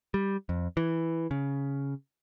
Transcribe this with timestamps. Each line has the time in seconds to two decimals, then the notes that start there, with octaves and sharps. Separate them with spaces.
0.14 G3
0.49 F2
0.77 E3
1.31 C#3